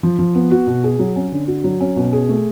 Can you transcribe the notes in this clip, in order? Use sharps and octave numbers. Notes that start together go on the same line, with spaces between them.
F3
F3
B3
F#4
B2
G#4
F#3
C#4
D3
F#4
F#3
C#4
B2
G#4
A3